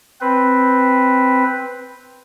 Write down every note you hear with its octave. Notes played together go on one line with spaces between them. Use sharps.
C4 B4